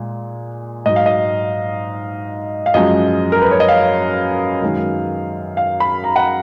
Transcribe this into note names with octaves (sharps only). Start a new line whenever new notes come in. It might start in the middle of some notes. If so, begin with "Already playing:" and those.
Already playing: A#2 G#3
G#2 F#3 D#5
F5
D#5
F5
F#2 F3 G#3 D#5
A#4
B4
C#5
D#5
F5
F#2 D#3 G#3
F5
B5
A#5
F#5